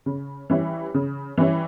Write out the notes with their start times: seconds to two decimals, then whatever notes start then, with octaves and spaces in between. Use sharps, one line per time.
0.06 C#3
0.50 E3 G3 C#4 E4
0.94 C#3
1.38 E3 G3 C#4 E4